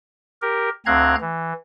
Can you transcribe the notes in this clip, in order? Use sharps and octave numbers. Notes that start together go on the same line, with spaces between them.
G4 A#4
D2 C4 F5 A#5 F#6 G#6
E3